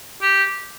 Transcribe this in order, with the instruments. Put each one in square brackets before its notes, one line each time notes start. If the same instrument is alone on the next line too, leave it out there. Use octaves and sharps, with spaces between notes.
[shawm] G4